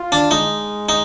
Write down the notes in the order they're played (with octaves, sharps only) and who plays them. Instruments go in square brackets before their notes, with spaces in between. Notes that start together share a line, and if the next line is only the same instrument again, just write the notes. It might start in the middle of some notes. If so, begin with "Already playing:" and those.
Already playing: [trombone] F4
[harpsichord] D4
[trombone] G#3 [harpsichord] D#4
[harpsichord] D#4